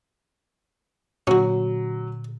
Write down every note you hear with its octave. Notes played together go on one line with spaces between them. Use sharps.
A#2 D3 F#3 C#4 F#4